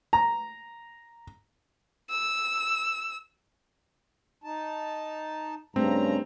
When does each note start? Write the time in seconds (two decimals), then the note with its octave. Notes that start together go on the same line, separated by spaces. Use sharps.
0.13 A#5
2.10 E6
4.44 D#4 A5
5.76 G2 C#3 A3 C4 A#5